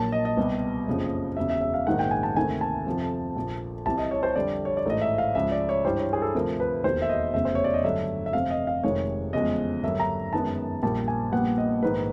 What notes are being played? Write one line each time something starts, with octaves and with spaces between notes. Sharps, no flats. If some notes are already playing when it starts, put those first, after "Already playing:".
Already playing: A#1 A#2 F#3 A#3 A5
D#5
D#5
C2 B2 G3 B3
F#1 F2 C#3 F3
E1 E2 C#3 E5
E5
E5
F5
A#1 G#2 D#3 G#3 F#5
G5
G#5
A5
D2 C3 D#3 G#5
A5
F2 C3 F3
A#1 A#2 F3
C2 C3 E3 A5
D#5
C#5
C5
F2 D3 G3 D5
C#5
D5
A1 G#2 E3 A3 D#5
E5
F5
C#2 C#3 F3 G#3 E5
D5
C#5
G2 E3 G3 C5
C#5
G#4
A4
D2 C3 F3 A#4
B4
E1 D#2 D#3 C5
E5
D#5
F1 E2 C#3 E5
C5
C#5
D5
D#5
G2 D3 F#3 E5
E5
F1 F2 C3 F5
D#5
F5
F1 F2 C3 D#3 G#3 C#5
E2 C#3 F3 G#3 D#5
G2 D3 F#3 A#3 E5
A#5
F#2 D#3 G#3 B3 A5
A#1 A#2 G3 A#3 A5
G#5
A#1 A#2 G3 B3 F#5
D#5
A#1 G#2 D#3 B4